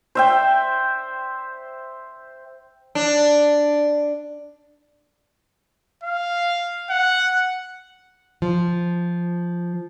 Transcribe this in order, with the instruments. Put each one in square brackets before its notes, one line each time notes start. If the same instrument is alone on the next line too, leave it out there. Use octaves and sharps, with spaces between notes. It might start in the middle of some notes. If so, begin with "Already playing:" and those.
[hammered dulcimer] C5 E5 G5
[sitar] D4
[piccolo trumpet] F5
F#5
[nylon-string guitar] F3